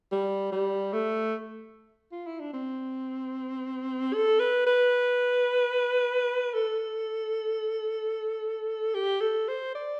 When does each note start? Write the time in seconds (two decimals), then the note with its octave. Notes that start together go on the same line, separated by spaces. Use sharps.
0.12 G3
0.52 G3
0.93 A3
2.12 F4
2.26 E4
2.40 D4
2.54 C4
4.13 A4
4.40 B4
4.67 B4
6.54 A4
8.94 G4
9.21 A4
9.48 C5
9.75 D5